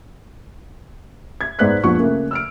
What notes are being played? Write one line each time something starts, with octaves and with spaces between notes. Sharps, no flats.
G#6
G#2 B3 C5 D5 F#6 B6
A#1 F3 B3 F#5 C#6 F#6
C#3 A3 A#3
E6 F6 D7